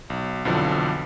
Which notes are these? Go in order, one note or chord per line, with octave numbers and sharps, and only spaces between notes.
B1
B1 F2 D3 E3 F3